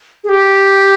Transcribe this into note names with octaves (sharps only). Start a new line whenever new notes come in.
G#4
G4